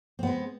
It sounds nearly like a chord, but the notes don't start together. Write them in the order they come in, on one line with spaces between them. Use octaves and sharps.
C4 B3 G#3